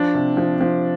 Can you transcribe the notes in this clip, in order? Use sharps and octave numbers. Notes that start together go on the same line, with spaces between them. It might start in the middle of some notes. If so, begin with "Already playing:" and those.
Already playing: F3 D4
C3
F3
F3